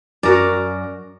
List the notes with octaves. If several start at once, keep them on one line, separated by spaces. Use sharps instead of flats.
F#2 F#4 A#4 D5